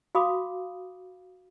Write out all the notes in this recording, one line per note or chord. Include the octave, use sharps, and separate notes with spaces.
F#4 F5 B5 D6 D#6